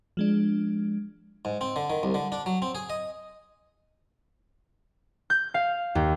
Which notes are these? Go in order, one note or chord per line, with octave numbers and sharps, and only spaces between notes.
F3 G#3 D4
G#2
C4
D3
D#3
C2
D3
D4
F#3
C4
G#4
D#5
G6
F5
D#2